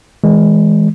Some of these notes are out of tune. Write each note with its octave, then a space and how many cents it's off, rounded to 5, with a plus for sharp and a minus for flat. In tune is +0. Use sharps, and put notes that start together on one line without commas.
E3 -30 G#3 +0